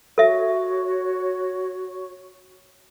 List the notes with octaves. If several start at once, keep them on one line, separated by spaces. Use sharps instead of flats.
F#4 A4 C#5 E5